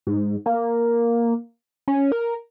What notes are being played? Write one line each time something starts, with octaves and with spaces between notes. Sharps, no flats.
G#2
A#3
C#4
A#4